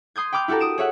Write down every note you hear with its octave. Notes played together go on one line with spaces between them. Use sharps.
C6 D#6 G6 G#6
G5 B5 D6 F6 G6
E4 F#4 G4 A4 A#4
D#6 D7 E7
G#4 C#5 E5 F#5